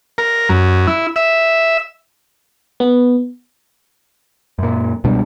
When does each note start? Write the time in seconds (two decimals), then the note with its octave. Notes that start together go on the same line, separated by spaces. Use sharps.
0.18 A#4
0.49 F#2
0.87 E4
1.16 E5
2.80 B3
4.59 F#2 A#2
5.04 C#2 B2 G3 D4